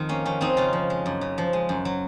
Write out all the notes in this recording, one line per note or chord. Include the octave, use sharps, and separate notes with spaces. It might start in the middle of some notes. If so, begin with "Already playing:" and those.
Already playing: F2 D#3
A#3 C#4
F2 C#4
F2 C4 D#4
C#3 C#4 F4
F3
G#3
F#2
C#3
F3
G#3
F#2
F#3